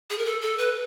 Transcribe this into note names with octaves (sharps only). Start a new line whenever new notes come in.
G#4
A#4
A4
A4
B4